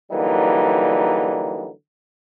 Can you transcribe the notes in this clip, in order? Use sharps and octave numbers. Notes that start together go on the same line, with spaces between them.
D3 E3 F#3 G3 A#3 D#4